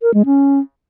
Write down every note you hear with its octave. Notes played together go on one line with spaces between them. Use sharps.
A#4
G#3
C#4